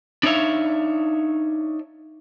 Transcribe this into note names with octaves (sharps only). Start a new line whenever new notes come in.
D4 D#4 C#5 E5 F5